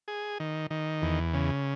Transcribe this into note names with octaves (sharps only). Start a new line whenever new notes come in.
G#4
D#3
D#3
E2
C#3